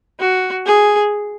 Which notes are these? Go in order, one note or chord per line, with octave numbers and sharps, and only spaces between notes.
F#4
G#4